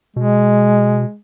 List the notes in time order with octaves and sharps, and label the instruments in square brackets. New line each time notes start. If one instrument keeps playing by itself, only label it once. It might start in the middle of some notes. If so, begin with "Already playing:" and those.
[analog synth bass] B2 [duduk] G#3